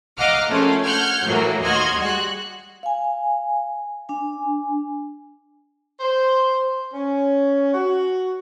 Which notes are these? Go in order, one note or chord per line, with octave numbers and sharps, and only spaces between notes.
D#5 F5 F#5 A#5 D6 F6
A#1 A3 C#4 C6
F#5 F6 G6 G#6
A2 E3 F#3 A#3
D#2 F#4 D#5 C6 F6 G#6
G3 G#3 F#4 F#6
F5 G#5
D4 G#5
C5
C#4
F#4